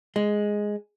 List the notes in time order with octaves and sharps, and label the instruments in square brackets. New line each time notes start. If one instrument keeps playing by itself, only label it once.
[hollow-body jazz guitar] G#3